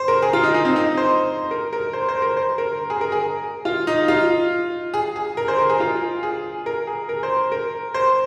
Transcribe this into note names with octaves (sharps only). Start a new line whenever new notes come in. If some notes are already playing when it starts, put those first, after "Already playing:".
Already playing: C5
A#4
G#4
F4
D#4
D#4
C4
D#4
C5
A#4
A#4
C5
C5
A#4
C5
A#4
G#4
A#4
G#4
F4
D#4
F4
G#4
G#4
A#4
C5
A#4
G#4
F4
G#4
A#4
G#4
A#4
C5
A#4
C5